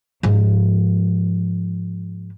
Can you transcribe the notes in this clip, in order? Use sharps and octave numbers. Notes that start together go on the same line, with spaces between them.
G#2 F3